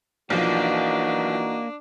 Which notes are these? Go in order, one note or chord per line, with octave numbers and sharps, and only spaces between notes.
B1 E3 F3 A#3 D4 D#4 F#4